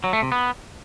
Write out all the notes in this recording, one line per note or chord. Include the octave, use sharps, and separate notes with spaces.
F#3
A3
C3
B3